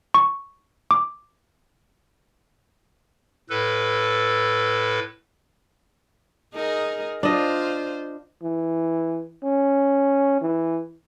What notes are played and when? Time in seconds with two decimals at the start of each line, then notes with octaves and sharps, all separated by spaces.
0.14 C#6
0.91 D6
3.50 A2 A4 B4
6.55 D#4 G#4 A#4
7.23 D4 F4 C5 D#5
8.43 E3
9.43 C#4
10.41 E3